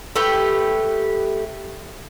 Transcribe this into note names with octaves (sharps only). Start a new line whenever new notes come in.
A3 G4 B4